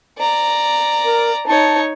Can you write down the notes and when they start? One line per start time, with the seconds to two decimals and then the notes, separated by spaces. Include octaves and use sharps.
0.18 D5 A#5
1.05 A#4
1.47 D#4 C#5 A5